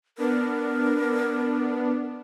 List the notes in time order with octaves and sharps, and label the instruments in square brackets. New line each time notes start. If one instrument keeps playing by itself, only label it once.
[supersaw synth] B3 D4 [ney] A#4